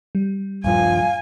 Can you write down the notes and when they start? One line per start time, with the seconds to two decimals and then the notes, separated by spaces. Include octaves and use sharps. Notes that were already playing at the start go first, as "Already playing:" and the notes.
0.15 G3
0.64 D#1 G2 F3 F5 G#5